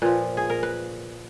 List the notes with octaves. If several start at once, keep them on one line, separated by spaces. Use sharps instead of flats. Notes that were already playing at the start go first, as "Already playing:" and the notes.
A#2 F3 B4
G#4
A#4
B4